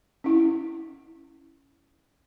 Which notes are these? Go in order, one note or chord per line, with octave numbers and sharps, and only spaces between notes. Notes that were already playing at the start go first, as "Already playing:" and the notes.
C#4 E4